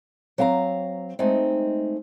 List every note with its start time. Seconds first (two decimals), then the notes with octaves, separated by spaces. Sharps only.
0.38 F#3 C4 F5 A5 A#5
1.19 G#3 A3 C4 D#4